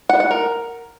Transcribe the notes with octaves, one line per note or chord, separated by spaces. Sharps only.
F#5
F#5
A#4